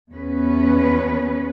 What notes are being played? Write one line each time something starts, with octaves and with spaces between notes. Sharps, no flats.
E2 B3 C#4 B4